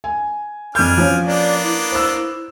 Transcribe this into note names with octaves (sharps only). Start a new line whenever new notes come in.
G#5
F2 D4 G#5 F6 G6
F3 C#4
A#3 B3 D4 D5
E4
C5 E6